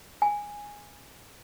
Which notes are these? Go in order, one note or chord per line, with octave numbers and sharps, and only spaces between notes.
G#5